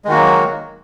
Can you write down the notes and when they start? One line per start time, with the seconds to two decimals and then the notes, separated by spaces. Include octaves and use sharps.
0.05 G#3
0.07 D#3
0.10 F#4
0.13 A#3
0.15 F#3